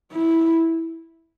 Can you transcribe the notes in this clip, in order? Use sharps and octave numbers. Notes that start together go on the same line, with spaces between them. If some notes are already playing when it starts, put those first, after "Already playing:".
E4